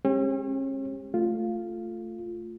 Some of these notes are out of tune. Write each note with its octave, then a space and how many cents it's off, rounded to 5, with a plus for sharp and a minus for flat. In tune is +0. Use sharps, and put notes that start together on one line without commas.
G#3 +0 C#4 -40 G4 +25
A3 +0 F4 +0